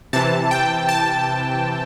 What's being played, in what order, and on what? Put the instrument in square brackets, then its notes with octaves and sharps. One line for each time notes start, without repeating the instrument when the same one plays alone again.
[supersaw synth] C3 E3 A5
G5
A5